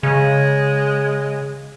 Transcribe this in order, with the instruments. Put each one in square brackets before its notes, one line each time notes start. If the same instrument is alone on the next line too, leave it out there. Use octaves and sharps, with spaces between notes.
[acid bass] C#3 [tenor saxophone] G#3